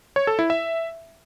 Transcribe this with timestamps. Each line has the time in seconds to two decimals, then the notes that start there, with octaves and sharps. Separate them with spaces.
0.16 C#5
0.27 A4
0.39 E4
0.50 E5